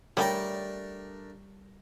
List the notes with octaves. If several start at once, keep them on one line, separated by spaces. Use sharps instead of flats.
G3 A3 D4 A#4 C#5 D#5 G5